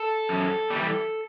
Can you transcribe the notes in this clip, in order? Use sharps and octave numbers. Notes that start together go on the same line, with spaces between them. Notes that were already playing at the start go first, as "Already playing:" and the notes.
Already playing: A4
F#2
G3
E3